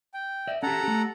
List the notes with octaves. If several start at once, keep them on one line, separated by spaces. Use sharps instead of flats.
G5
D5 E5
C#4 G4 A4 F#5 A#5
A3 G4